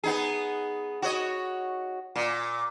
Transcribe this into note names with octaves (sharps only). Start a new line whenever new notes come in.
B3 D#4 G#4
F#4 C#5 D#5
A#2